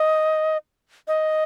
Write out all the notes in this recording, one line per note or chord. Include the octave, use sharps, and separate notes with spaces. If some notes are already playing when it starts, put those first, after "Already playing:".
Already playing: D#5
D#5